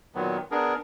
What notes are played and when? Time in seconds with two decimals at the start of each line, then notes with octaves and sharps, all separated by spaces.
0.15 A#2 D#3 F#3 B3
0.51 B3 D4 G#4 A#4